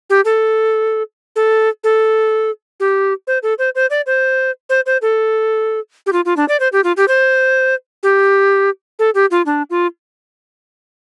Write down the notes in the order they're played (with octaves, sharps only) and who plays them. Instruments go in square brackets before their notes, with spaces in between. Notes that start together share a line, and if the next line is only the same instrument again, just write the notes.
[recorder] G4
A4
A4
A4
G4
C5
A4
C5
C5
D5
C5
C5
C5
A4
G4
F4
F4
D4
D5
C5
G4
F4
G4
C5
G4
A4
G4
F4
D4
F4